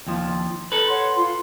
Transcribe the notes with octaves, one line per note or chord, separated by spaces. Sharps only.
D#2 F3
A4 B4
C#5 F#5 C6
F4 C6